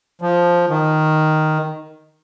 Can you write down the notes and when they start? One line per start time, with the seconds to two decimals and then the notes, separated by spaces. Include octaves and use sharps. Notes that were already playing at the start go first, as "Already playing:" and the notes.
0.21 F3
0.70 D#3